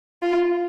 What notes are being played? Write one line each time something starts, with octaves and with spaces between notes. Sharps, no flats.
F4